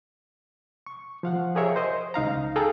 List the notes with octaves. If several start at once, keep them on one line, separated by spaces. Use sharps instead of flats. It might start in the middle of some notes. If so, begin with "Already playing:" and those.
C#6
F3 F5 F#5
G4 G#4 A#4 C#5 E5
C5 D#5
C#2 D#4 F5 A#5
G#4 A4 F5 G5 A#5